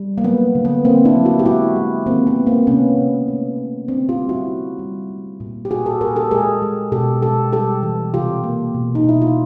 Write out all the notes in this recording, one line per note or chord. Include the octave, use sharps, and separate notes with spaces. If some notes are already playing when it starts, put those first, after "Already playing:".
Already playing: G3
A#3
F#3 B3
D3
B3
D3 A#3 C4
D4 E4
F#3
E4 F#4
G4
G#3 E4 F#4
G#3
D#3 A#3 C4
B3
G#3
A#3 C4
C3 B3 C#4
C3
A3
C3
D3 C4 D4
F4 G4
G3
E4 F#4
A#3
G3
A3
A#2
G4
A#2 F#4 G#4
G4 A4
A#2 G#4 A#4
G4 A4
G#3 G#4 A#4
G#3
B2 G4 A4
G#3 G4 A4
G3 G4 A4
E3
C3 F4 G4
A#3
B2
D#4
B2 E4
F4